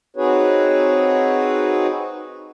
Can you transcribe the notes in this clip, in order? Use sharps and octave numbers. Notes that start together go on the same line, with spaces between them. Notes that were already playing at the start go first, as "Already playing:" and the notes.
C4 D#4 F#4 G#4 B4 C#5